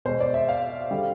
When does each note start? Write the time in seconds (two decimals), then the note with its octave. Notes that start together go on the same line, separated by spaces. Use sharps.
0.05 B2 G#3 C5
0.20 D5
0.34 E5
0.49 F5
0.91 D3 G3